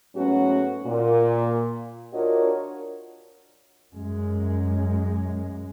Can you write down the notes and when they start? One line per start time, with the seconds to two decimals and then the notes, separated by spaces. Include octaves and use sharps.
0.15 G#2 F#3 A3 B3 C#4 F#4
0.86 A#2
2.13 D4 F4 F#4 A#4 C#5 D#5
3.93 F#2 G#3